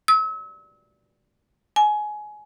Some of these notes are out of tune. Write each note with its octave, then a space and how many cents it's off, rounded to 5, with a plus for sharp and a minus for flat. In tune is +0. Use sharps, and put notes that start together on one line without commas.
E6 -40
G#5 +20